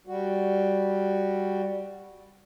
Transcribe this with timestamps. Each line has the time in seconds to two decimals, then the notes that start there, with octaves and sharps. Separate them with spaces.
0.07 G3 F#4